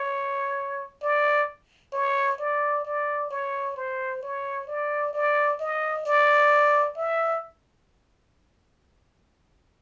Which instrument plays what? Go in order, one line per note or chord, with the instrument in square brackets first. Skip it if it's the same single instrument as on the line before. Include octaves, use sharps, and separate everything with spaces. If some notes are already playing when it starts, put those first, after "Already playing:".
Already playing: [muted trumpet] C#5
D5
C#5
D5
D5
C#5
C5
C#5
D5
D5
D#5
D5
E5